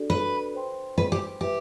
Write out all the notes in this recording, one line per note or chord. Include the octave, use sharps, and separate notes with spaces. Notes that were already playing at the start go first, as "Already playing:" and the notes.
Already playing: D4 F#4 A4 D5
B4
C5 G5 C6
B4
G4
E4 G4 B4 E5